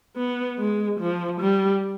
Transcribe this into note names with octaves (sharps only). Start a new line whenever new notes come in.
B3
G#3
F3
G3